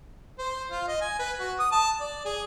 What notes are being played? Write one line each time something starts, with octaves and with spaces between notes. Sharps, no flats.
C5
F4
D#5
G#5
B4
F#4
D#6
A5
D5
G#4